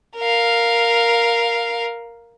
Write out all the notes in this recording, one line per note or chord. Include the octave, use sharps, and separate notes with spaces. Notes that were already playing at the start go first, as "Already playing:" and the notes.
A#4 F5